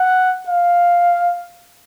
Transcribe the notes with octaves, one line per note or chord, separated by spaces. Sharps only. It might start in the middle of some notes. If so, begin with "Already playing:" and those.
Already playing: F#5
F5